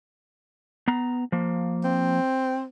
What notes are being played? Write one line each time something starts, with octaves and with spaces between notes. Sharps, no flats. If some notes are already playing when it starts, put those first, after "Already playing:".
B3 A#5
F3 A#3
C4